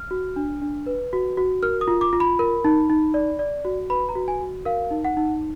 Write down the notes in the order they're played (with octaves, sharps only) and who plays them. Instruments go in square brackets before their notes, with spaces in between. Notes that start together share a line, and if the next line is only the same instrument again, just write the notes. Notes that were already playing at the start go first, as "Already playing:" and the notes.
Already playing: [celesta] F6
F#4
D4
D4
B4
F#4
F#4
A#4 F6
D#6
F4
D6
F4
B5
A#4
D#4
D#4
D5
D5
F#4
B4 B5
A#5
F#4
G#5
F#4
A#4 F5
D#4
F#5
D#4